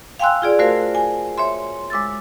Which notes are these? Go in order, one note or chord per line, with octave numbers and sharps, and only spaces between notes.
F5 G5 G#5 C6 E6 F#6
F4 G#4 D5
A3 F#4 A#4 C5 F5
G#5
C#5 E5 C6
G#3 D6 E6 A6